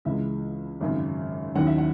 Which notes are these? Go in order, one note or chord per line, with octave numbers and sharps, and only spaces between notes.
C#2 C#3 E3 G#3 E5
G#1 F#2 C#3
D#2 D#3 F#3 C#4 E4 F#5
E5
F#5